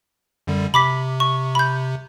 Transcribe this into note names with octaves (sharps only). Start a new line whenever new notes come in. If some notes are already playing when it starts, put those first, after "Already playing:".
F#2 D3 G3
C3 B5 D6 B6
C#6
B5 G6